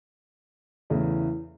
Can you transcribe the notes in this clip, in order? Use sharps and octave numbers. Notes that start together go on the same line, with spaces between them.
E2 C#3 E3 A3